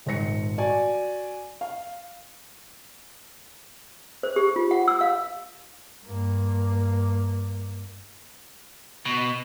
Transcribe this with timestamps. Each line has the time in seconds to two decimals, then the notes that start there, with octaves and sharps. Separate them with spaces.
0.06 D#1 G#1 C5 A#6 C#7
0.58 F#4 D5 G#5
1.61 F5
4.23 C5
4.36 G4
4.56 F4
4.71 F#5
4.88 E6
5.01 F5
6.05 G2 A#3
9.05 B2